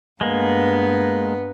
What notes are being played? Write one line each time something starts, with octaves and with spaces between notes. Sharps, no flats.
G2 G#3 A#3 B3